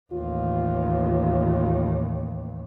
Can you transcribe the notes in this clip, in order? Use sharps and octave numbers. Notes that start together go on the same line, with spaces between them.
A1 D#2 F4